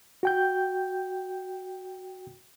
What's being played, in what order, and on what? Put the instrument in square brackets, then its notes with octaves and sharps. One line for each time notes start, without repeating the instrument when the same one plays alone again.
[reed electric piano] F#4 G5 G6